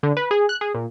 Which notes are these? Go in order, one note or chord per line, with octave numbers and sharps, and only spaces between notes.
D3
B4
G#4
F#6
G#4
A#2